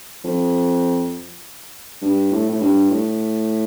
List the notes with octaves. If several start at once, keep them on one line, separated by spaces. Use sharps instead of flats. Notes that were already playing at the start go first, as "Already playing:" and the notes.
F2
G2
A2
A2
G2
A2